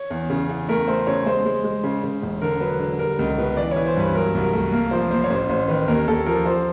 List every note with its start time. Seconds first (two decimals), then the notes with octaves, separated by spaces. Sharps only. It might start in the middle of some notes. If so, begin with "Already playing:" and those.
Already playing: C#5
0.10 E2
0.30 C#3
0.49 E2
0.68 A3 A#4
0.88 A3 C5
1.07 C#3 C#5
1.26 G#3 C5
1.45 G#3
1.64 G#3
1.84 C#3
2.03 C#3
2.22 E1
2.41 D3 A#4
2.61 F#3 B4
2.80 D3
2.99 G3 A#4
3.19 C#2 A#4
3.38 B2 B4
3.57 E3 D5
3.71 E3 C#5
3.86 C5
3.96 G2 B4
4.14 F#3 A#4
4.35 C2
4.44 A#4
4.53 A3
4.72 A#3 A#4
4.91 F3 C5
5.11 A#3 C5
5.24 C#5
5.30 A1 C5
5.49 A1 C5
5.68 D#3 B4
5.88 D#2 A#4
6.07 D#2 A4
6.26 F3 A#4
6.45 F3 C5